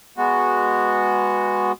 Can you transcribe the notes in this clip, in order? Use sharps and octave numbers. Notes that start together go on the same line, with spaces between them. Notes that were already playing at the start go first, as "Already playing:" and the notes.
G#3 B3 F#4